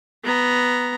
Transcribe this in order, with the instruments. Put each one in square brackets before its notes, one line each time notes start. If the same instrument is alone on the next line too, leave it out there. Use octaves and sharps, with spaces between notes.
[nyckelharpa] B3 A#5